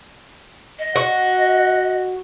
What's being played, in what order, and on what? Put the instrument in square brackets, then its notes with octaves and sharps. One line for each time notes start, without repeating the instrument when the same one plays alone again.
[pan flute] D#5
[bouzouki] F#4 [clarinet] F#5